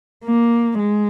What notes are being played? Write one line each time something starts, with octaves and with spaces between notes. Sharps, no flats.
A#3
G#3